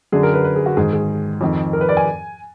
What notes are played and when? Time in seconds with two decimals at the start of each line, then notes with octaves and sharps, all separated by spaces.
0.12 F#2 D3 G#4
0.23 A#4
0.34 B4
0.44 B4
0.56 G#4
0.66 F#4
0.77 G#2 D#3 G#4
0.93 G#4
1.41 F2 D#3
1.73 A#4
1.81 B4
1.89 D5
1.97 G#5